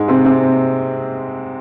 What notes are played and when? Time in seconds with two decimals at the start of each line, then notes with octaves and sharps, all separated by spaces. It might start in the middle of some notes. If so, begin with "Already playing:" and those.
Already playing: G#2 G#3
0.08 C3 C4
0.25 C3 C4